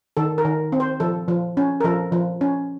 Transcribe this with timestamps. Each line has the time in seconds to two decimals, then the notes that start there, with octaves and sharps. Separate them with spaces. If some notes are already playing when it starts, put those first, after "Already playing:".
0.17 D#3 A4
0.38 A#4
0.45 D#3
0.72 C4
0.80 C5
1.00 F3 A4
1.28 F3
1.57 C#4
1.81 A#4
1.84 F3 A4
2.12 F3
2.41 C#4